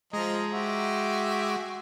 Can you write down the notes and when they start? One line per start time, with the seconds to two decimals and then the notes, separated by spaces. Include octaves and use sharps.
0.13 F3 G#3 D#5 A#5
0.52 F#4 G4 E5